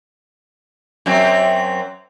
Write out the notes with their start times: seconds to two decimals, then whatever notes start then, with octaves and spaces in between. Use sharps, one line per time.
1.06 F#2 F#3 C4